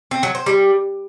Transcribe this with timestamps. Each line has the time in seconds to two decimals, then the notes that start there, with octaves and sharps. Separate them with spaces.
0.11 C4
0.23 F#3
0.35 C5
0.46 G3